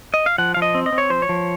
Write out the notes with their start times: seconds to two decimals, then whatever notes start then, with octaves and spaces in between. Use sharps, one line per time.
0.14 D#5
0.26 F5
0.38 F3 F#5
0.54 F3 F5
0.62 D#5
0.75 C4
0.86 D#5
0.92 C4
0.98 C#5
1.10 F3 C5
1.22 C#5
1.29 F3